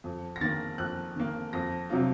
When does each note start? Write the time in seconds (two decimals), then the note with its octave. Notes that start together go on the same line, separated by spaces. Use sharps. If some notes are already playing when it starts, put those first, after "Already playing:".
0.04 F2
0.36 A#6
0.41 D#3 A#3 A6
0.78 F2 F#6
1.16 D#3 A#3
1.53 F2 A#6
1.90 C3 F#3 C4 F4